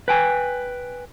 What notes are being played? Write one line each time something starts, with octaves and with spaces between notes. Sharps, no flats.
B4 G5 G#5